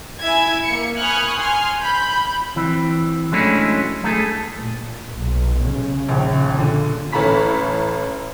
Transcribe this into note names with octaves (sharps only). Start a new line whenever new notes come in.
E4 E5 G#5 G#6
A#3 C#7
G#5 B5 C#6 D#6 F6 F#6
G#5 C6 F6
B5 G6
E3 C4
F#3 G#3 A3 C#4 D4 E4
A3 G#4 A4
A#2
B1
C#3
A#1 D#2
A#2 D3
A1 C#4 A4 A#5 B5 B6